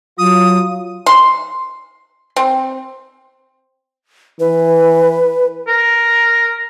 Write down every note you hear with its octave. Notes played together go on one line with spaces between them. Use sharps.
F#3 F4 D#6
C6
C4
E3 B4
A#4